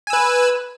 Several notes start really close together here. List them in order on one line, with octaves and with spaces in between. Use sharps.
G#5 E6 B4